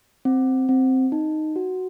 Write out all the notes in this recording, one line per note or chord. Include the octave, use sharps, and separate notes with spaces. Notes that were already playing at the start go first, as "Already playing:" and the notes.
C4
C4
D#4
F#4